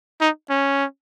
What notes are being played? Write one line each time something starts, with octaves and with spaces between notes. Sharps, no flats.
D#4
C#4